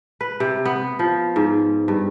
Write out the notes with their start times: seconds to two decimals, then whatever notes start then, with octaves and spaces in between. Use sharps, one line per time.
0.21 B4
0.40 C3
0.65 B3
0.99 F3
1.36 G#2
1.88 G2